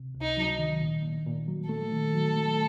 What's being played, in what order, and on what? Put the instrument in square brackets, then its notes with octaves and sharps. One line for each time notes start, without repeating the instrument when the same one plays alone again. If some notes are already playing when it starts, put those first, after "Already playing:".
Already playing: [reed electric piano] C3
C#2
[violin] D#4
[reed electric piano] F#3
D#3
A#2
A#2
A#2
F#3
[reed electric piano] A3 [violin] A4
[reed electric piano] D#3
F#3
A3